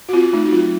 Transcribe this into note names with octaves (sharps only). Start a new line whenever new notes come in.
F#4
C4 F4
A3 D#4
F#4
F#3 F4